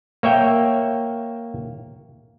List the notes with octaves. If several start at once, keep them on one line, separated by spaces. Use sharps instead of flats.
A#3 C#5 E5 G5